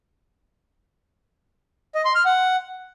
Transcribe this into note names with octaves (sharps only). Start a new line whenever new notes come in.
D#5
C6
F6
F#5